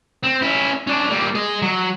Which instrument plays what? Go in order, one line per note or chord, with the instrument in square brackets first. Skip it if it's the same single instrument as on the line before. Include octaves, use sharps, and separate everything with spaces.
[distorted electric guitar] C4
C#4 E4
C#4 D4
G3 A#3
G#4 D#5
F#3